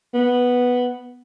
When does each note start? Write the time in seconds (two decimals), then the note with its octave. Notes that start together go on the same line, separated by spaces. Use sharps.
0.14 B3